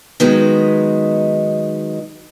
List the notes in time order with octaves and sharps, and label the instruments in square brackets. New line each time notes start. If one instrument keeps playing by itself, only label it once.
[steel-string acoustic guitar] D#3 F#3 G#3 B3 D#4